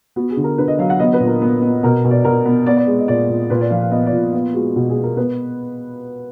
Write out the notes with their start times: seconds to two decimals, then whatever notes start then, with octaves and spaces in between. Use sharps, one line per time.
0.16 B3 F#4
0.30 G#4
0.37 D3
0.44 A#4
0.58 D3 B4
0.68 D#5
0.79 F#3 F5
0.90 F#5
0.99 B3 D#5
1.13 B4
1.20 A#2
1.27 A#4
1.41 B3
1.62 B3
1.83 B2 A#4
2.04 B2
2.11 D5
2.24 B2 A#4
2.45 B3
2.66 B3 D5
2.77 D5
2.87 G#3
2.99 D#5
3.08 A#2 D5
3.29 A#2
3.50 A#2 B4
3.61 D5
3.70 F3 F5
3.82 F5
3.91 B3 D#5
4.06 D5
4.13 A#2
4.33 B3 F4
4.54 G#3 F#4
4.76 B2 F#4
4.89 G#4
4.96 B3
5.03 A#4
5.17 B3 B4